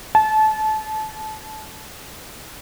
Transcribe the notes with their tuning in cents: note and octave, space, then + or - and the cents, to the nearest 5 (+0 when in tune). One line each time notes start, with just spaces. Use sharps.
A5 -25